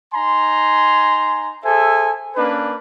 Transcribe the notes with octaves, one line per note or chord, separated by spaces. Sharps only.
D#4 G#5 A#5 C6
G#4 A4 C5 E5 G#5
A#3 C#4 D4 B4